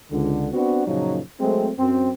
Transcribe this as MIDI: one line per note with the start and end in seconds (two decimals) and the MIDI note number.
0.11 0.50 37
0.11 0.50 50
0.53 0.85 59
0.53 0.85 60
0.53 0.85 62
0.53 0.85 66
0.87 1.21 42
0.87 1.21 46
0.87 1.21 49
0.87 1.21 53
0.87 1.21 54
0.87 1.21 63
1.40 1.70 54
1.40 1.70 56
1.40 1.70 57
1.40 1.70 60
1.79 2.11 42
1.79 2.11 60